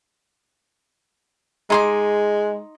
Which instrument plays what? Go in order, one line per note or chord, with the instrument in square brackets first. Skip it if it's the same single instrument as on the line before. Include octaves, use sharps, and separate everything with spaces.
[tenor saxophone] G#3 [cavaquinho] D#4 C6 D6